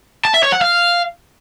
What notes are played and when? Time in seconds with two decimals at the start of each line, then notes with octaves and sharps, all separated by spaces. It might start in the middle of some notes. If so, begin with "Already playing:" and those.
0.25 A5
0.34 E5
0.43 C#5
0.52 F#5
0.61 F5